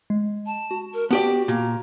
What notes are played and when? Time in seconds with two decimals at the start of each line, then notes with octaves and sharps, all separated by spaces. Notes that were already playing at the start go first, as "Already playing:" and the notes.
0.10 G#3
0.46 A5
0.71 F#4
0.94 A#4
1.11 B3 F#4 G4 D5 A5
1.48 A#2 A#5